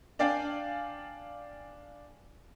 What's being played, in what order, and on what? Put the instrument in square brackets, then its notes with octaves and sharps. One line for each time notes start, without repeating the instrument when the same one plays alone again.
[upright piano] D4 D5 F5 G5 G#5